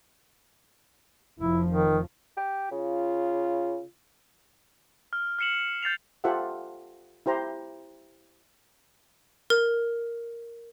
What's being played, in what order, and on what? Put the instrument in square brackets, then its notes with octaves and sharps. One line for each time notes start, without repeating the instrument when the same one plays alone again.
[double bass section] F1 F3 [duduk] E4
[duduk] D#3
[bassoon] G4
[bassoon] C#3 [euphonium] F4
[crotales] F6
F6 C7 C#7 E7 F#7
G6 A6 C7 F7
[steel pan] F4 G4 A4 C5 E5 F#5
E4 G4 C5 A#5
[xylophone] A#4